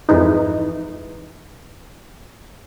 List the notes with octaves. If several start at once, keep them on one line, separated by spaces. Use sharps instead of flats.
F2 G#2 E3 D#4